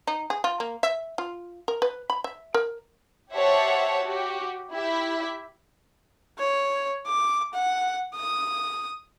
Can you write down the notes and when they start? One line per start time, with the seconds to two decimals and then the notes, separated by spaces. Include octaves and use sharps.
0.07 D#4
0.30 G#4
0.44 F4
0.60 A#3
0.83 E5
1.18 F4
1.68 A#4
1.82 B4
2.10 B5
2.24 E5
2.54 A#4
3.33 G4 C5 C#5 E5 F#5 A5
4.04 F#4 G4
4.72 E4 G4 E5
6.39 C#5
7.07 D6
7.54 F#5
8.15 D#6